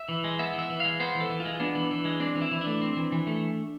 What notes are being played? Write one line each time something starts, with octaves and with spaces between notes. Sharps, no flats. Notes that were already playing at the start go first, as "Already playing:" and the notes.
Already playing: E5
E3
G#3
B3 E5
E3
E5
E3
G#3 F5
B3 C5
E3
A4
E3
F4
G#3
B3 D4
E3
E3
G#3
C4 D4
E3
E4
E3
D4
A3
C4
E3
E3
A3